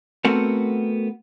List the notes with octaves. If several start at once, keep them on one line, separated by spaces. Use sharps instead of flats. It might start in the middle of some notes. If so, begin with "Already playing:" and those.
A3 B3 C4 F#4 A4 A#4